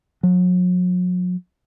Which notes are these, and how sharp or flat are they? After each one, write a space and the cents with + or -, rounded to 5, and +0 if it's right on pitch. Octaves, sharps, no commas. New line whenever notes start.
F#3 -40